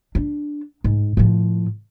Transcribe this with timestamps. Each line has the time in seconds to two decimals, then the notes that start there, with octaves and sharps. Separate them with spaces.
0.15 D4
0.84 G#2
1.17 A2 F3